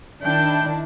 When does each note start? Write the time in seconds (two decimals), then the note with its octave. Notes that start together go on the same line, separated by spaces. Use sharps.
0.22 D#3 D4 E4 G5 G6